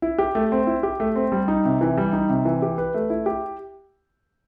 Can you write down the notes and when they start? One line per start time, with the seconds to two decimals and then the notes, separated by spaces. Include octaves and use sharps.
0.02 E4
0.18 G4
0.35 A3
0.52 C4
0.67 E4
0.83 G4
1.00 A3
1.16 C4
1.32 G3
1.48 D#4
1.65 C3
1.81 E3
1.98 G3
2.13 D#4
2.30 C3
2.45 E3
2.62 G4
2.78 B4
2.94 A3
3.10 E4
3.26 G4